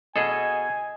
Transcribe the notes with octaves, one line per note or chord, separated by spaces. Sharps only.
B2 G#4 A4 D#5 G#5